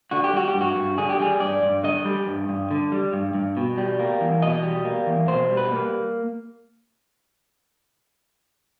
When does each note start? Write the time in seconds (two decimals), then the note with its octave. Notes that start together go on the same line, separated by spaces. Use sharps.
0.11 D3 F#4
0.24 G4
0.33 G3 F#4
0.48 G4
0.54 G2
0.61 F#4
0.76 G2
0.98 D3 G#4
1.09 G4
1.20 G3 G#4
1.40 G2 D5
1.63 G2
1.84 D3 D#5
2.05 G3
2.27 G2
2.49 G2
2.71 D3
2.92 G3
3.13 G2
3.34 G2
3.57 B2
3.78 G3
3.99 A#3
4.21 E2
4.42 B2 D#5
4.63 G3
4.85 A#3
5.07 E2
5.28 B2 C5
5.50 G3
5.57 B4
5.72 A#3